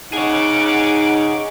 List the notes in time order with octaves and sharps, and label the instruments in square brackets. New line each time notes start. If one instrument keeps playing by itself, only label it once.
[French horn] D#4 [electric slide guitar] G#4 C#5 [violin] F#5 D6